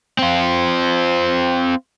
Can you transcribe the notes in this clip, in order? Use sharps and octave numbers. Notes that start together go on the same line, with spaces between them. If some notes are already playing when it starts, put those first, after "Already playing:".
C4 F4